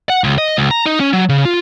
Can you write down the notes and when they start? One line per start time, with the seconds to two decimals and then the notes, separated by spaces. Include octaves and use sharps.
0.10 F#5
0.24 C#2
0.38 D#5
0.58 C#2
0.71 A#5
0.86 D#4
1.00 C#4
1.13 F#3
1.29 C#3
1.45 F4